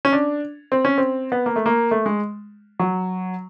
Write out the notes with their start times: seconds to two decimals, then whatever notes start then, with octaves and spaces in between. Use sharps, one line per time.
0.05 C#4
0.12 D4
0.72 C4
0.85 C#4
0.98 C4
1.32 B3
1.46 A#3
1.56 A3
1.66 A#3
1.91 A3
2.06 G#3
2.79 F#3